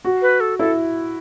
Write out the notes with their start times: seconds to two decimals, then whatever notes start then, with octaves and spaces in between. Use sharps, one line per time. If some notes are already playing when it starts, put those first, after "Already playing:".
0.05 F#4
0.22 B4
0.40 A4
0.59 E4 A4